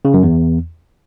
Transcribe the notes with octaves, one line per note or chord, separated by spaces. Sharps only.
C#3
F#2
E2